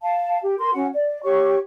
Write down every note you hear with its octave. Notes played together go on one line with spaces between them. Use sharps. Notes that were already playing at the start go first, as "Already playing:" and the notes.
F5 A5
G4
A#4 C6
C#4 F#4 F#5
D5
G4 C#5 C#6